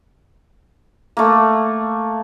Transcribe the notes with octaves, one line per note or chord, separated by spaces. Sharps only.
A3 A#3